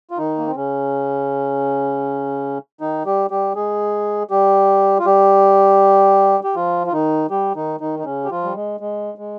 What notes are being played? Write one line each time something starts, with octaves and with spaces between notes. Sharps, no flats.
F4
D#3 D#4
A#3
C4
C#3 C#4
D#3 D#4
G3 G4
G3 G4
G#3 G#4
G3 G4
F4
G3 G4
G4
F3 F4
F4
D#3 D#4
G3 G4
D#3 D#4
D#3 D#4
D#4
C#3 C#4
G4
F3 F4
G3
G#3
G#3
G#3